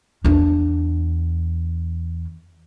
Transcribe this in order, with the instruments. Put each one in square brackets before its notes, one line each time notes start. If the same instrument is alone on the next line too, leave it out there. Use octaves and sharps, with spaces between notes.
[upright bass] E2 D4